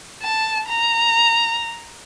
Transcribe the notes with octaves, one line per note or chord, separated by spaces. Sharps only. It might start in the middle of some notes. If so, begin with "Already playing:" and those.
A5
A#5